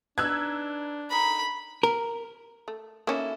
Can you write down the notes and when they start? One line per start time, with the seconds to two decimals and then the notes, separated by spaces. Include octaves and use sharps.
0.18 D4 D#4 B4 E6 F#6 G#6
1.11 D#4 A4 A#4 B5
1.83 A#4
2.68 A3
3.07 A#3 C#4 D#4 E4 F#4 A4